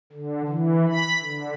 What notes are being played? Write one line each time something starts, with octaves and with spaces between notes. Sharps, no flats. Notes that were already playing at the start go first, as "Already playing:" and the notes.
D3
E3
B5
D3